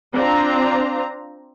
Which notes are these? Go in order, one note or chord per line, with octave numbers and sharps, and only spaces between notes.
C4 D4 F4 A#5